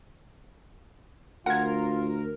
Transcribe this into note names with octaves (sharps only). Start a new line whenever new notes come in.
D2 F4 A#4 F#5 G#6